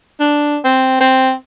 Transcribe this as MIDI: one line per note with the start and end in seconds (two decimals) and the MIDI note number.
0.20 0.57 62
0.64 0.95 60
1.00 1.32 60